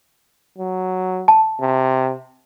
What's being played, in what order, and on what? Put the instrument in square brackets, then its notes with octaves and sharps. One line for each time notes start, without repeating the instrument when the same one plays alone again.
[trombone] F#3
[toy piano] A5
[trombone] C3